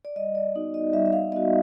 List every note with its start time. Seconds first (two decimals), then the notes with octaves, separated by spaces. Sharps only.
0.05 D5
0.16 G3 D#5
0.35 D5
0.55 B3 D#4 F#4
0.74 D#5
0.93 G3 E5
1.06 E5
1.13 F5
1.32 B3 D#4 F#4 D#5